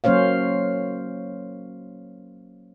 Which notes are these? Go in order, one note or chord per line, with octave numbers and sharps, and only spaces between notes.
F#3 A#3 C#4 C5 C#5 F5